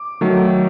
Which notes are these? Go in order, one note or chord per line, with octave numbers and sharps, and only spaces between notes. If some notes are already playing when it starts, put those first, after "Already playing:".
Already playing: D6
D#3 F#3 A3